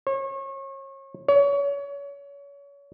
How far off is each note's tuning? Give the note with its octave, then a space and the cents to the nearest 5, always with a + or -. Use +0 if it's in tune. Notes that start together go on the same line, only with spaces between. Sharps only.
C#5 -35
C#5 +30